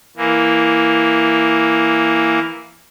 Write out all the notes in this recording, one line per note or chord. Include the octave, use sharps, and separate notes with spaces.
E3 A#3